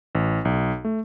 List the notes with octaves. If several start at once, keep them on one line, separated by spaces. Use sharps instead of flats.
A1
B1
A3